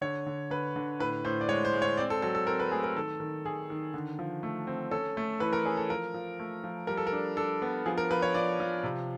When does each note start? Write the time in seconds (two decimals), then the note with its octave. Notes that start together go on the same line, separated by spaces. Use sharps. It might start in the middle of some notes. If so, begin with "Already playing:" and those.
0.01 D3 C#5
0.26 D3
0.50 D3 B4
0.76 D3
0.99 A2 B4
1.25 A2 C5
1.41 D5
1.49 G#3 C#5
1.65 C5
1.74 G#3
1.82 C#5
1.97 C4 D5
2.10 A4
2.22 F#3 A4
2.35 A4
2.47 C4 A#4
2.59 B4
2.72 A3 G#4
2.84 A#4
2.95 D#3 A4
3.20 D#3
3.45 D#3 G#4
3.70 D#3
3.94 D3
4.19 F3
4.43 A3
4.67 C4
4.91 C#4 A4
5.17 A3
5.40 E3 B4
5.53 A#4
5.65 C#4 G#4
5.77 A4
5.89 F3 A#4
6.14 F3
6.39 A3
6.64 F3
6.87 G3 A#4
6.97 A4
7.07 A#4
7.13 D4
7.37 D4 A4
7.62 B3
7.86 F3 G#4
7.98 A#4
8.11 F3 B4
8.22 C#5
8.34 F3 D5
8.60 F3
8.83 C3